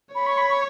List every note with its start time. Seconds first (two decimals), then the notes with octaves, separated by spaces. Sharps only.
0.15 C#5 B5
0.27 C#6
0.38 B5
0.49 C#6